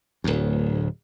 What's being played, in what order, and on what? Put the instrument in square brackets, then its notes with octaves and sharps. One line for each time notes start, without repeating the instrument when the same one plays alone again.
[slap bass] D1 D2